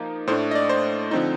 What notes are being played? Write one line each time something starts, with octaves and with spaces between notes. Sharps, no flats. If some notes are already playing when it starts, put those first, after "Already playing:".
Already playing: F3 A#3 D#4
A2 A3 D4 C5
D#5
D5
C5
D3 F3 C4 D#4